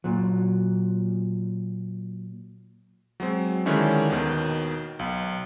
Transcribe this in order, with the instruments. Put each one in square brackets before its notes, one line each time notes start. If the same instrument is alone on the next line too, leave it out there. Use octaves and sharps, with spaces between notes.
[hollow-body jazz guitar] A#2 F#3
[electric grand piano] F#3 G#3 C4
D3 D#3 G#3 C#4 E4 G4
D#2 B2 D#3
B1